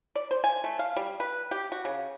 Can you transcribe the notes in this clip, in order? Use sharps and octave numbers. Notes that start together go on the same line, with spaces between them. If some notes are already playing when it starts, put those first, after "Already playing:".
D5
C5
G#5
A3
F5
G3
B4
G4
F#4
C#3